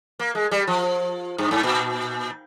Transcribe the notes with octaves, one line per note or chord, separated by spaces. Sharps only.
A#3
G#3
G3
F3
G2
G#2
A#2